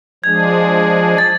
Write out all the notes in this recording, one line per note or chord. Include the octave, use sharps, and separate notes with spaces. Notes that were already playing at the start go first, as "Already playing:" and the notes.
F3 G#3 D4 G#4 G#6
A6